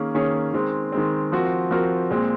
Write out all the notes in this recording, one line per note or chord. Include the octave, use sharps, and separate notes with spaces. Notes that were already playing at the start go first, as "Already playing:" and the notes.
Already playing: D#3 A#3 C#4 G#4 C#5
D#3 A#3 C#4 G#4 C#5
D#3 G#3 C4
D#3 G#3 C4
F3 C4 F#4 A#4
F3 C4 F#4 A#4
A#2 G#3 C4